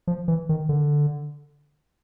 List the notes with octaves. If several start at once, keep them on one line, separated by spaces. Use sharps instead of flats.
F3
E3
D#3
D3